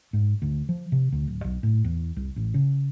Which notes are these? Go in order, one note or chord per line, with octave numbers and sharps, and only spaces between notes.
G#2
D2
F3
C3
D2
D1
B1
A2
E2
C2
A1
C#3